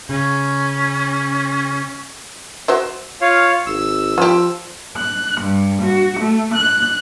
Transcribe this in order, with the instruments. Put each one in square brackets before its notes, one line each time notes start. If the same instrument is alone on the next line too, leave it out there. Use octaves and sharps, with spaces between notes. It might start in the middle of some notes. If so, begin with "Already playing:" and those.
[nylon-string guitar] C#3 [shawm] C#4
[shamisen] F#4 C5 E5
[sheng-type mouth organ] F4 C#5 F5
[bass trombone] G#1 [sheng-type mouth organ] E6
[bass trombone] F3 [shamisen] F4 G4
[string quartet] F#6
G2
F#4
A3
F#6